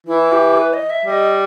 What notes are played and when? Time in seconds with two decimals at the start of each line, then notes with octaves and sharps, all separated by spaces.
0.07 E3 E4
0.32 G4
0.57 B4
0.73 D#5
0.90 E5
1.06 G3 E5
1.10 D#5